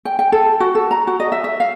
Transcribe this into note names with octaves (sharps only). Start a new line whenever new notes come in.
G5
G5
A4
F#4
A4
A#5
F#4
D#5
E5
E5
F5